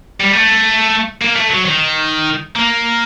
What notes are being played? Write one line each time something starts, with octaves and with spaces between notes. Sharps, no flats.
G3
A3
A#3
A3
F#3
D#3
A#3